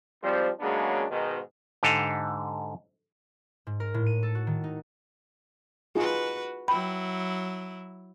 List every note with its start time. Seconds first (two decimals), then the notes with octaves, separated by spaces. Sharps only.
0.22 G#1 F3 G3 C4 C5
0.60 C#3 F#3 G#3 A#3 B3 D4
1.11 G#2 B2 D#3
1.83 G#2 D3 G4 A4 D#5 F5
3.67 G#2
3.80 A#4
3.94 A2
4.06 D#7
4.23 A4
4.35 F#4
4.47 D#3
4.64 D#4
5.95 D#4 F4 F#4 G#4 B4
6.68 F#3 E4 G5 B5